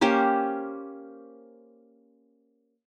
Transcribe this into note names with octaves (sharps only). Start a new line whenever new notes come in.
A#3 C#4 G4 C5